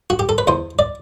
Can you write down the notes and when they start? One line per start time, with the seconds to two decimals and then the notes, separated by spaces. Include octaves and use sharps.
0.10 F#4
0.19 G4
0.29 A4
0.38 B4
0.47 E2 C5
0.79 D5